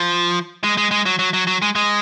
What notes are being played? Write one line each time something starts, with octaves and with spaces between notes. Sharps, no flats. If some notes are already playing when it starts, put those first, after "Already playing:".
Already playing: F3
G#3
G#3
G#3
F#3
F#3
F#3
F#3
G#3
G#3